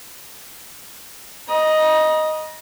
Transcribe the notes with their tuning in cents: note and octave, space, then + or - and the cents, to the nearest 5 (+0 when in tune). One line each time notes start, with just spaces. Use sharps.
D#5 +0 A#5 +45